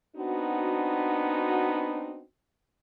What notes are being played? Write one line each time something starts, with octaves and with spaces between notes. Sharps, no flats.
B3 C4 D4 D#4 F#4